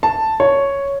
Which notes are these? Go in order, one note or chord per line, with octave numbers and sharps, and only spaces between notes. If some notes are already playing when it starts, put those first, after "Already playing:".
A5
C#5